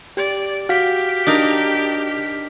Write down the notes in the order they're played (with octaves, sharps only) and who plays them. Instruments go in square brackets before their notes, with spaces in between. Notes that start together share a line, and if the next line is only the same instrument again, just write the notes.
[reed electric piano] G4 [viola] D5
[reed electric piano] F#4 F5 [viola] G4 [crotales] F6 B6
[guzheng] D4 D#4 A#4